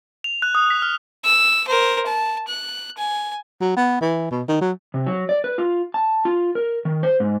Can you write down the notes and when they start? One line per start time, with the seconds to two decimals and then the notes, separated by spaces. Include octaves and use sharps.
0.24 F7
0.42 F#6
0.55 D#6
0.70 B6
0.82 F6
1.24 E6
1.68 A#4 C5
2.06 A5
2.48 F#6
2.98 G#5
3.61 F#3
3.76 B3
4.01 E3
4.31 B2
4.48 D#3
4.61 F#3
4.94 C3
5.07 F#3
5.29 D5
5.44 B4
5.58 F4
5.94 A5
6.25 F4
6.55 A#4
6.85 D#3
7.03 C5
7.20 G#2